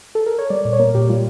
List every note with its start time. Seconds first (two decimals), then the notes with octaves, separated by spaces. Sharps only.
0.15 A4
0.26 A#4
0.38 C#5
0.50 G3 D5
0.65 A#2 D5
0.73 C#5
0.79 A#3 A#4
0.94 A#2 G4
1.09 G3 F4